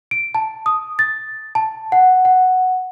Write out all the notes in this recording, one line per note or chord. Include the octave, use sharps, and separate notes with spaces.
D7
A5
D#6
A6
A5
F#5
F#5